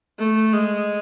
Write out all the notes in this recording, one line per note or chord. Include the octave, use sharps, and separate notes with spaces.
A3
G#3